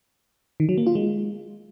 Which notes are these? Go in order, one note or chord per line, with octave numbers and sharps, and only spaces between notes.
D#3
F#3
A#3
F4
G#3